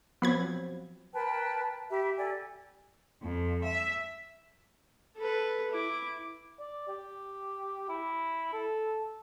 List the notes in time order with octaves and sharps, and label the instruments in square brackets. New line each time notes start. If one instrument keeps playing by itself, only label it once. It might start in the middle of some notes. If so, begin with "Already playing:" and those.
[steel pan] F3 F#3 C4 [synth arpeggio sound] B3 B5 G#6
[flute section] A#4 B4 G5 A5
G4 E5 B5
G4 A4 D5 G#5
[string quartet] F2
E5
[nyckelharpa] A4 B4
E4 D6
[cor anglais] D5
G4
E4
A4